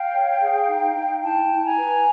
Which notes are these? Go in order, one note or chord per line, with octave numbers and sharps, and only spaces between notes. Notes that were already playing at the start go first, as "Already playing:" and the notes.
Already playing: F5 G5
C#5
G#4
D#4
D#4
E4 G5 A5
E4
G#5 A#5
B4